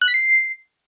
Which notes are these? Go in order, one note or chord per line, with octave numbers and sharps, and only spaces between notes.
F#6
B6
C7